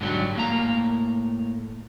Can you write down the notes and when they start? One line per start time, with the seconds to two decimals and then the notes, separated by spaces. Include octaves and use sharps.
0.01 G#2 D3 F#3 G3
0.35 A2 A#3 A#5